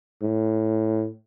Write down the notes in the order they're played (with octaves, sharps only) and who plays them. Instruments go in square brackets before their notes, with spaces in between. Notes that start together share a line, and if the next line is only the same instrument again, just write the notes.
[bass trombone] A2